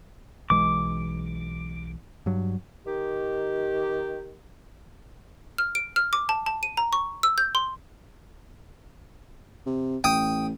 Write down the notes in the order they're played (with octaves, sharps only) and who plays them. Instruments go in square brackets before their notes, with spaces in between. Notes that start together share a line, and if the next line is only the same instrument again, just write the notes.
[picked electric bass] B1 E3 G#3 [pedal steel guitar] D6
[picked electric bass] G2 F#3
[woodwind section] D#3 G4
[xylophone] F6
D7
F6
D6
A5
A5
D#7
A#5
C#6
E6
G6
C6
[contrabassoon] C3
[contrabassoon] A1 [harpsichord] G5 D#6